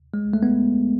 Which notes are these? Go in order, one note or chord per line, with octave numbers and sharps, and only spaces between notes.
G#3
A3
B3